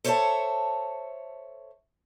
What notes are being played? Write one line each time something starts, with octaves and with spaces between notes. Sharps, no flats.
A4 C5 C#5 D#5 E5 A5